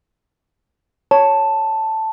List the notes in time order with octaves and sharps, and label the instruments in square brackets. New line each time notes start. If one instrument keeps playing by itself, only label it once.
[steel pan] C#5 [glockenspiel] A5